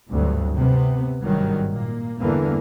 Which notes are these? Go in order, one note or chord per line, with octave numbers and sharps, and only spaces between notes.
G#1 D2 G2 F#3
C3 B3
G#1 G2 D#3 F#3 G3
A#2 A#3
E2 G2 D3 E3 A#3